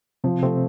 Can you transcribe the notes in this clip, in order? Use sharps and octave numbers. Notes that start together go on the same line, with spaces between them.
C3 F3 C4
C3 A3 C4